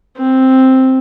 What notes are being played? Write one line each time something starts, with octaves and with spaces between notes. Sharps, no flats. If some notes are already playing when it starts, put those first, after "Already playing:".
C4